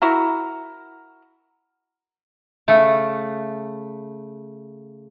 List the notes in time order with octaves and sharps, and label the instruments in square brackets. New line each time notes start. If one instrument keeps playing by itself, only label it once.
[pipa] E4 F#4 A#4
[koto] C#3 A3